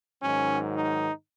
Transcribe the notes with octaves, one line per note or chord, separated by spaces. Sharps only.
G#2 D#3 F#3 C#4
D#4